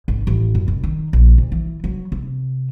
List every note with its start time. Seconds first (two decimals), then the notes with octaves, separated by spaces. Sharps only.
0.08 G#1
0.27 A1
0.55 F#2
0.68 F1
0.83 D#3
1.13 A#1
1.38 D2
1.52 E3
1.84 F#3
2.12 C3